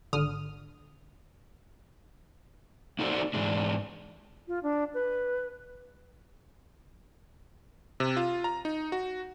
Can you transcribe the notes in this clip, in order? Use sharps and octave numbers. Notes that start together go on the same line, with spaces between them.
G#1 D3 D#6 F6
A#3 D#4 F#4 A4 C5 D5
G#2 E3 G#3 D4
F4
D4
B4
C3
F4
A#5
D#4
F#4